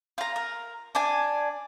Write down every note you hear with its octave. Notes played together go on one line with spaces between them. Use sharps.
F4 A#5
A#4
D4 D5 G#5